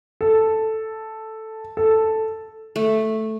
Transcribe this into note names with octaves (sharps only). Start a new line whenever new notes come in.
A4
A4
A3